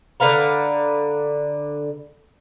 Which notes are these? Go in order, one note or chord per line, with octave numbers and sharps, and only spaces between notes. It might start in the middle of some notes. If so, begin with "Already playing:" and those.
D3 B4 F5 A#5